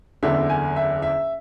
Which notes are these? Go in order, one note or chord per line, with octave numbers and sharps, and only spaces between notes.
F#1 E2 D3 E5
G#5
E5
E5